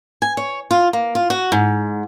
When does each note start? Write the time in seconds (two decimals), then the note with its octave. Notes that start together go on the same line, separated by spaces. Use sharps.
0.22 G#5
0.37 C#5
0.71 F4
0.93 A#3
1.15 F4
1.30 F#4
1.52 G#2